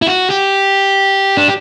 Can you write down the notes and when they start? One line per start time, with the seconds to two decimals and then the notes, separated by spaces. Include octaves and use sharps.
0.02 E4
0.07 F#4
0.30 G4
1.37 D4